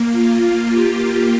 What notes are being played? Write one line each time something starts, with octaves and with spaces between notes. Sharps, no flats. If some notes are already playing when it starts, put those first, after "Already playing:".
Already playing: A#3
F4
G4